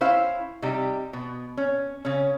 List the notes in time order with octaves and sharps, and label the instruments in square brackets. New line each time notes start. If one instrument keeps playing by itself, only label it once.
[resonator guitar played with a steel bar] C#4 E4 C5 E5 F5
C3 G3 D#4 G4
B2
C#4
C#3 C#4